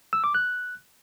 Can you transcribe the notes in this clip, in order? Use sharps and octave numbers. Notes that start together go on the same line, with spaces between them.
E6
D6
F#6